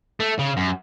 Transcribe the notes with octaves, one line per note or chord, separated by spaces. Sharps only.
A3
C#3
F#2